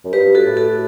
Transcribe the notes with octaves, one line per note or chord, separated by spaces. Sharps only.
F#2
G2 G4 B4
F#4 A4
A2
F#4 A4